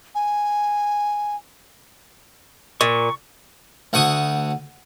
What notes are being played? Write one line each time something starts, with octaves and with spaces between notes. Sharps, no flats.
G#5
A#2 C#6
D2 F#5 C#6 D#6